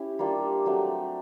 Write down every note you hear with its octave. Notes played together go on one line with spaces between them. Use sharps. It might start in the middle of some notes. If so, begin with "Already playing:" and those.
Already playing: C#4 E4 G4
G3 A#3 D4 F4
F#3 A3 C4